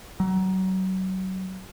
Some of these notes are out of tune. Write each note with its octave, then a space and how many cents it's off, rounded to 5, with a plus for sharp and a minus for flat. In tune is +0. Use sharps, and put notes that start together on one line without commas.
F#3 +30